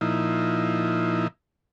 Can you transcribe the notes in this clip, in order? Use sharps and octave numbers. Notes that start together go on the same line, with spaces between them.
A#2 F3 D#4 E4